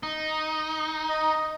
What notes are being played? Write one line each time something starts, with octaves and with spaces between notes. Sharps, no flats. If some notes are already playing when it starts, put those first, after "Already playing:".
D#4
D#5